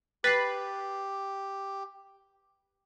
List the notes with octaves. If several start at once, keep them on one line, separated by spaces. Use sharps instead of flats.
G4 B4 A6 C7